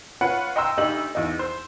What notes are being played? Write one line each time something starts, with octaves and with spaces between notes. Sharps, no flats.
F4 B4 C#5 F#5
D#5 G5 A#5 C6 E6
D2 D#4 G4 F#7
E2 D#4
C5